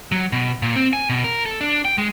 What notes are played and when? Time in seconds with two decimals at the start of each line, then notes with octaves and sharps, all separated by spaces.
0.12 F#3
0.32 B2
0.62 A#2
0.76 C4
0.93 G#5
1.09 B2
1.24 A#4
1.46 A4
1.61 D4
1.85 G5
1.98 G#3